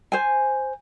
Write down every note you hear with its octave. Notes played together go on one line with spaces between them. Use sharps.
C5 G#5